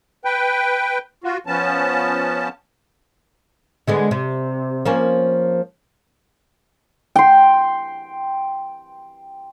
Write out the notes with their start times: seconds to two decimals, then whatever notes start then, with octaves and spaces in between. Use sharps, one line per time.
0.25 B4 G5
1.24 F4 F#4
1.47 F3 B3 C#4 A5
3.87 D3 G#3 B3
4.11 C3
4.85 F3 A#3 C#4
7.16 G5 C6